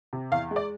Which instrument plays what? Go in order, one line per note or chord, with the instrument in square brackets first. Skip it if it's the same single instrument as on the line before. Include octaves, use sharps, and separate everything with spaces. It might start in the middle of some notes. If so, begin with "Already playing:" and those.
[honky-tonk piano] C3
E2 F5
G#3
D5